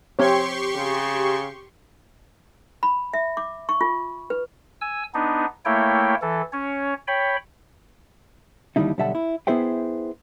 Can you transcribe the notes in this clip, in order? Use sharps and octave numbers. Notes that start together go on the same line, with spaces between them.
C4 G4 C#5 C6 C#6
C#3
B5
E5
D6
C#6
F4
B4
G#5 E6
B3 D4 D#4
A3 A#3 E4 C#5 G5
E3 A4
C#4 C#5
C#5 G5 B5
D#2 G#2 D3 G3 D#4 E4
B1 D3 G3 E5 F#5 A5
E4
B3 E4 G#4 C5 E5 G5